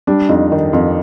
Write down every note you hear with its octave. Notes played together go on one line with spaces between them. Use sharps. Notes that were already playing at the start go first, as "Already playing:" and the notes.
G3 D4
F2 D#4
D#3
F2